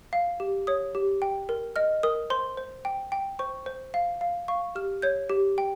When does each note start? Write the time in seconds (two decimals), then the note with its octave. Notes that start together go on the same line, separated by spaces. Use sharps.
0.13 F5
0.40 G4
0.67 C#5 D#6
0.95 G4
1.22 G5
1.49 A#4
1.76 D#5 F6
2.03 A#4 D#6
2.30 C5 C6
2.57 C5
2.85 G5
3.12 G5
3.39 C5 C#6
3.66 C5
3.94 F5
4.21 F5
4.48 F5 C#6
4.75 G4 F6
5.02 C#5 G6
5.30 G4
5.58 G5